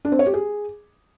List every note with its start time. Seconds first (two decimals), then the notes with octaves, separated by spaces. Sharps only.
0.05 D4
0.12 C4
0.19 C#5
0.26 G4
0.34 G#4